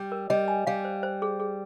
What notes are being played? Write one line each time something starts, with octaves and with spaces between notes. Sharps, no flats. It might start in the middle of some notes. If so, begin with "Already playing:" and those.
Already playing: G3
A#4
G3 D#5
G#5
G3 F5
C5
C5
G#4
G#4